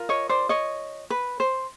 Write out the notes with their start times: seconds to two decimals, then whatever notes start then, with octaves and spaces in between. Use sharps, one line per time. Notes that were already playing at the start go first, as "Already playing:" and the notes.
Already playing: F4 A#4
0.09 C#5 D#5
0.29 C5 D5
0.49 C#5 D#5
1.10 B4
1.40 C5